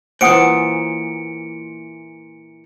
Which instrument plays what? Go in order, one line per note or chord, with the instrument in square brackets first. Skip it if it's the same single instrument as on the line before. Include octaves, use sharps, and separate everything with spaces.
[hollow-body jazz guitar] A#2 E3 [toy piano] C5 F#5 D#6 [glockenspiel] C#7 D7